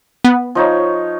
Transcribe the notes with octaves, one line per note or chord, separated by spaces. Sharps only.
B3
F3 D#4 C#5